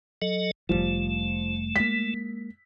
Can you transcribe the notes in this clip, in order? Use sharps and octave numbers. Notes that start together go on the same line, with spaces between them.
F#3 A4 D#5
F1 C2 F3 G3 A3
G#3 A#3 B6